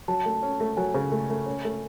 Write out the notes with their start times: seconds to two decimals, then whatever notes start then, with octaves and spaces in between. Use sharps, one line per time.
0.08 F#3 A5
0.26 A3
0.43 C#4
0.60 A3
0.77 F#3 G#5
0.94 C#3
1.12 A3
1.30 A3
1.46 C#4
1.65 A3